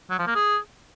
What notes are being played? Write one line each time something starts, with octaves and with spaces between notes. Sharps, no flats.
F#3
F3
A#3
G#4